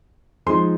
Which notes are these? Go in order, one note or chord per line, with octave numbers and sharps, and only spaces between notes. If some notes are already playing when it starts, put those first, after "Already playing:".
F3 G#3 D#4 C6